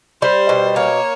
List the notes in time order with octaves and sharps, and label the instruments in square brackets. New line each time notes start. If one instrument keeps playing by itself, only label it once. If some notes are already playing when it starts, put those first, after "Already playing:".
[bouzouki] G3 [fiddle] C5
[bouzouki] B2
[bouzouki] A#3 [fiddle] C#5